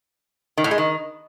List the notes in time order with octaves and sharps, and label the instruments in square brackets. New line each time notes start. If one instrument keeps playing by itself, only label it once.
[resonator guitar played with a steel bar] D#3
A2
G#3
D#3